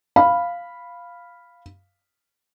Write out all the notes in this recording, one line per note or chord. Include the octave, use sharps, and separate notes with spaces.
F5 B5